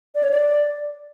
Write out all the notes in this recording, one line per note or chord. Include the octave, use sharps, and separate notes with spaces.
D5
C#5
D5